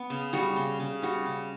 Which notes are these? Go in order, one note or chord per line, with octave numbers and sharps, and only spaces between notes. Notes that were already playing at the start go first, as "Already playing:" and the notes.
Already playing: B3
C#3
G3 F#4
C#3
C#3
G3 F#4
C#3